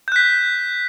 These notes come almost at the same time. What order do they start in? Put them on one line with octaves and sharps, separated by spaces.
G6 F#6 B6